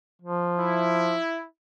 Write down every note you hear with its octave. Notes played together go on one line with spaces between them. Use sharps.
F3
E4